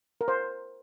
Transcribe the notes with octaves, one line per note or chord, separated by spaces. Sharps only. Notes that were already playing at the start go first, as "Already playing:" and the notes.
A#4
C5